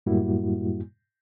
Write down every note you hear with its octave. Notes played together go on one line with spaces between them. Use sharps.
F#2 A2 G3 A#3 E4 F#4